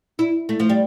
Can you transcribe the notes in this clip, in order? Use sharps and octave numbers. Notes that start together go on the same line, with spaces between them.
E4
A3
F3
G3